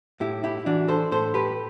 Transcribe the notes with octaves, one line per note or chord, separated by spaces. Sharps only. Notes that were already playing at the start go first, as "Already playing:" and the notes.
A2 E4 G4
E4 G4
E3 D4 F#4
A4 C5
A2 A4 C5
G4 B4